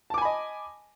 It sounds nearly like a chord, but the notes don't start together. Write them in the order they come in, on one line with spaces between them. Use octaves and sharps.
A5 D6 G#5 B5 D#5